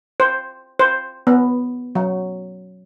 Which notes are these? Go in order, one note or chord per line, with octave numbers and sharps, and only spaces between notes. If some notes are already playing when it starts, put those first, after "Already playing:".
C5
C5
B3
F#3